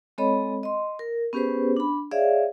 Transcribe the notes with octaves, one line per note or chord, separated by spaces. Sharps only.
G#3 C4 A4 C#5 D#5 B5
D#5 C6
A#4
B3 C#4 G4 G#4 B4 C5
D4 B5
G#4 C#5 D5 E5 F5